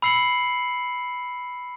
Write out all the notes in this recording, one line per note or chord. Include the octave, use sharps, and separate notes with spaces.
B5 E6 C7 C#7 F#7